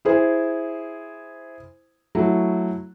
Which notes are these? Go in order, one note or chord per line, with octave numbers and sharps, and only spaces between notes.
E4 G#4 C5
F#3 A3 E4 F#4